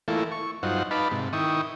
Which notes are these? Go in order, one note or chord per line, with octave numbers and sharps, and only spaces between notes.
E3 A3 A#3 E4 F4 A4
C#6
G2 F#3 D#4 F4 C5 F#5
D#4 B4 F5 A5 B5 D6
G#2 C3
D#3 E4 G5 C#6 D#6